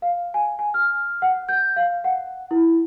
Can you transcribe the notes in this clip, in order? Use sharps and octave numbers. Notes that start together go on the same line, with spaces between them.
F5
G#5
G#5
F6
F#5
G6
F5
F#5
E4